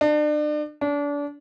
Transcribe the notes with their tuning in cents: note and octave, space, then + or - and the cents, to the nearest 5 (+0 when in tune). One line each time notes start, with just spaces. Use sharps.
D4 +35
D4 -30